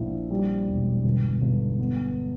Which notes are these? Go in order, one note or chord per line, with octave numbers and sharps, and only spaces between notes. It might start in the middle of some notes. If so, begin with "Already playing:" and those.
Already playing: A#1 E4
G3
E1
G1
G1
B3